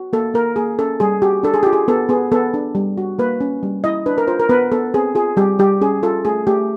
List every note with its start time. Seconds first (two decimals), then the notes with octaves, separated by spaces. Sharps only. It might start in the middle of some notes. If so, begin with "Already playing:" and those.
Already playing: F#4
0.13 A#3 A4
0.34 A#3 A#4
0.56 A#3 G#4
0.79 C#4 A4
1.00 G3 G#4
1.22 F#4 G4
1.43 D4 A4
1.54 G#4
1.63 F4 G4
1.73 G#4
1.88 B3 A4
2.09 B3 G#4
2.32 B3 A4
2.54 D4
2.75 G3
2.98 F#4
3.19 A#3 B4
3.41 C#4
3.63 G3
3.84 E4 D#5
4.06 D4 B4
4.18 A#4
4.27 F4 C5
4.40 A#4
4.49 B3 B4
4.71 B3 A4
4.94 C4 G#4
5.15 F4 G#4
5.37 G3 G4
5.59 G3 G4
5.81 C#4 G#4
6.03 F4 A4
6.25 A3 G#4
6.47 A3 G4